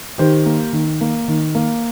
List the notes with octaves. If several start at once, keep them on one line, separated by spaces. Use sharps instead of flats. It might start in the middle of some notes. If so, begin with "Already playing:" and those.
D#3 G4 C5
A#3
D#3
A#3
D#3
A#3